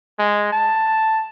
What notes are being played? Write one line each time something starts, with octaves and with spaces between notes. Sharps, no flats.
G#3
A5